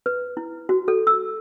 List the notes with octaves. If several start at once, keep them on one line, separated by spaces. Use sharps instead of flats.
B4
E4
F#4
A4
E6